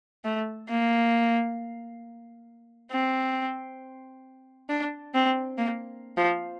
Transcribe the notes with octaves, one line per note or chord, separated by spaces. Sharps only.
A3
A#3
C4
D4
C4
A#3
F3